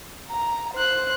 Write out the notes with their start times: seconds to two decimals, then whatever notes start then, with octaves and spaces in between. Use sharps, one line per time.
0.31 A#5
0.74 C5 F#6